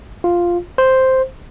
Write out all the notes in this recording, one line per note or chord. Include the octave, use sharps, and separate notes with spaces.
F4
C5